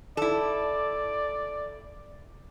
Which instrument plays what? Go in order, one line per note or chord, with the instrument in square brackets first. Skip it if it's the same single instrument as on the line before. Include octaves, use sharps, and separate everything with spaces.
[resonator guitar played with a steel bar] E4 A4 [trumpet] D5